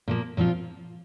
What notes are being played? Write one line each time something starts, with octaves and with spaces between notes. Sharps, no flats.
A#2 F3 A#3
A#2 F3 C4 F4